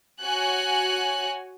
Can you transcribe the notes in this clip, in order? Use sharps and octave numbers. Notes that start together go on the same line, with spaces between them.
F#4 C#5 G#5 F#6